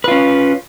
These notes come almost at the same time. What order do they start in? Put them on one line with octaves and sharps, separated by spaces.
B4 F4 C#4